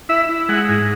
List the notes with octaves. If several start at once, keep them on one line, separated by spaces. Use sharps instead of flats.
E4 E5
E4
G#3 F#5
G#2